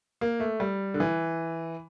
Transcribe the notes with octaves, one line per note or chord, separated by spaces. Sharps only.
A#3
A3
G3
D3
E3